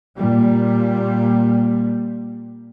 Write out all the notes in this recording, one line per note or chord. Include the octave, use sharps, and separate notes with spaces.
A#2 G3